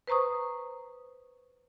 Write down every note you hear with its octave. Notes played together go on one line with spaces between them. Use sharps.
B4 C5 A#5 C#6 D#6